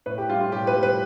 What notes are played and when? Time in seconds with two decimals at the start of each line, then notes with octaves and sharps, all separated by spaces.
0.06 A2 B4
0.18 G4
0.29 G3 F4
0.41 F4
0.52 A2 G4
0.67 B4
0.76 G3
0.83 B4